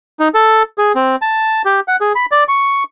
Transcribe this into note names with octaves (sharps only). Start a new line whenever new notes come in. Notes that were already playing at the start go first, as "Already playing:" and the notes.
D#4
A4
G#4
C4
A5
G4
F#5
G#4
B5
D5
C#6